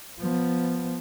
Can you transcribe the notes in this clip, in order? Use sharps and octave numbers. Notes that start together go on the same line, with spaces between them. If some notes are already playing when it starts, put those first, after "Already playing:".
F3 B3